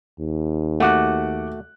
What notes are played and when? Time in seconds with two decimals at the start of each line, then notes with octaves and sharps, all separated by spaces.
0.20 D#2
0.80 A3 F#4 F#5 D6 F#6